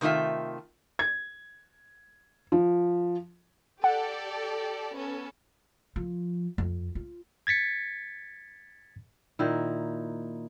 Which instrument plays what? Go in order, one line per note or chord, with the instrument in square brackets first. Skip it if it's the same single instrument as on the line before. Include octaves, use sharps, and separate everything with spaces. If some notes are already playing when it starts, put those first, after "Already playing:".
[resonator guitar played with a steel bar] C3 D#3 A3 F4 E5
[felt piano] G#6
F3
[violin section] G4 A4 D5 [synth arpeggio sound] F#5
[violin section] B3 C#4 A4
[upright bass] F3
F2
F4
[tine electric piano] G#6 A6 B6 C#7
[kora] A#2 D#3 E4